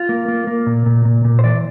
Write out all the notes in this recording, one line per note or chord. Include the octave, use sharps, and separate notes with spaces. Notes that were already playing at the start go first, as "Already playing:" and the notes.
Already playing: F4
A#3
A#3
A#3
A#2
A#2
A#2
A#2
C5
E3 D5